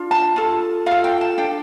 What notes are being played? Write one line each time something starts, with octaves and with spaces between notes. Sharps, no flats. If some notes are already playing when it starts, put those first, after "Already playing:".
Already playing: D4 F4
A5
F4 A4
F4 A4 F5
G5
A5
D4 A4 G5